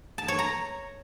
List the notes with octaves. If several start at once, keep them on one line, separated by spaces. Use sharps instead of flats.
A5
C#5
A#5